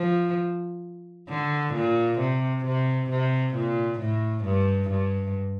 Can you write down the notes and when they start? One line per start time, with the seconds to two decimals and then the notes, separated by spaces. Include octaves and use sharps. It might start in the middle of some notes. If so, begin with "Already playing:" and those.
Already playing: F3
1.30 D3
1.74 A#2
2.20 C3
2.65 C3
3.10 C3
3.55 A#2
4.00 A2
4.45 G2
4.90 G2